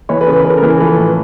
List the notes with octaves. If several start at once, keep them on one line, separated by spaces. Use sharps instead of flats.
E3 B4 C#5
A4 B4
C#3
B4
A#4
C#3 A4
A#4
E3
F3 A4 B4
A2